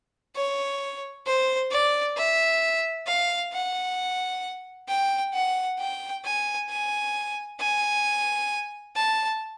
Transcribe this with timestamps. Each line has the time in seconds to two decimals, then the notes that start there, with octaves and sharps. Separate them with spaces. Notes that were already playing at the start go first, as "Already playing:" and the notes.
0.36 C#5
1.26 C5
1.72 D5
2.17 E5
3.07 F5
3.53 F#5
4.89 G5
5.34 F#5
5.79 G5
6.25 G#5
6.70 G#5
7.60 G#5
8.96 A5